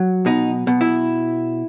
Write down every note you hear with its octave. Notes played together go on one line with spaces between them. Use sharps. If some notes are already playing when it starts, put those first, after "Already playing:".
Already playing: F#3
B2 D#4
B2
E4